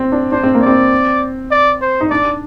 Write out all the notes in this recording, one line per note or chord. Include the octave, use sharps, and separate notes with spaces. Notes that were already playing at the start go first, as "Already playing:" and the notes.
Already playing: C4
D4
D4 C5
C4
A#3
C4 D5
D5
C5
D#4
D4 D5